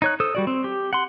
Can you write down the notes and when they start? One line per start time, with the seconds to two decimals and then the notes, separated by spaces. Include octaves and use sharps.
0.02 D#4 C#5 F#6
0.20 A4 C5 D#6 E6
0.35 G3 F#4 D5
0.47 C4
0.64 G4
0.93 F#5 C6